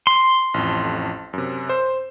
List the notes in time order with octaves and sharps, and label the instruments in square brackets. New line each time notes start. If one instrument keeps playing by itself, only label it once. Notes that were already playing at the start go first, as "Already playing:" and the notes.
[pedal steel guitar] C6
[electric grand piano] A1 F2
F#2 C3
C5